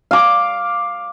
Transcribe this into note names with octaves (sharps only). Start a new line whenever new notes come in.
F5 D6